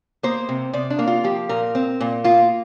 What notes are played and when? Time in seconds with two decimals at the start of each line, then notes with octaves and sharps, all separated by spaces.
0.23 A#3 C5
0.49 C3
0.73 C3 D5
0.90 D4
0.99 A#3
1.07 F4
1.24 F3 G4
1.49 A#2 A#4
1.75 C4
2.01 A#2
2.24 A#3 F4